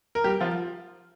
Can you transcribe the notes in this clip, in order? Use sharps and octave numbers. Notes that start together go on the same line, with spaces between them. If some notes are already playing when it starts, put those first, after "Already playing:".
A#4
G3 G4
F3 F4